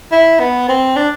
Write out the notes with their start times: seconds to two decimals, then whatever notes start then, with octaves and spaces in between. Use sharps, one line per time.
0.12 E4
0.39 B3
0.68 C4
0.96 D4